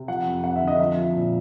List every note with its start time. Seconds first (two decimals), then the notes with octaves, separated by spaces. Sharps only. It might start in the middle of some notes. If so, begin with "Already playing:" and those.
Already playing: C3
0.08 F3 F#5
0.26 F2
0.44 F2 F#5
0.56 E5
0.62 D3
0.67 D#5
0.79 F3 E5
0.97 F3
1.15 A#2